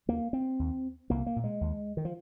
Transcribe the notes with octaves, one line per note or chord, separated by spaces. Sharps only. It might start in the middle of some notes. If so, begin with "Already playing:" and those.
D#2 A#3
C4
D#2
C2 A#3
A#3
A#2
G#3
D#2
D#3
F3